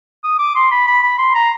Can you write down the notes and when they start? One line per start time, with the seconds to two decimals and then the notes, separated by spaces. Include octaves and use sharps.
0.24 D#6
0.39 D6
0.55 C6
0.71 B5
0.87 B5
1.03 B5
1.19 C6
1.35 A#5